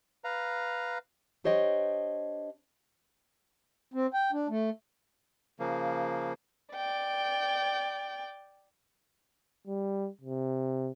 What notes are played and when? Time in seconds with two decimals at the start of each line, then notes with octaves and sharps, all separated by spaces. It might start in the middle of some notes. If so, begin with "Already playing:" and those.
0.24 B4 F5 A#5
1.44 D4 G4 C5 C#5 D#5 G5
3.94 C4
4.13 G5
4.32 D4
4.50 A3
5.59 C#3 F3 A#3
6.74 D5 G5
9.67 G3
10.21 C3